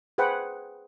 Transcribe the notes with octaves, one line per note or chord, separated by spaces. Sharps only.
G#4 B4 C5 F#5 G5 B5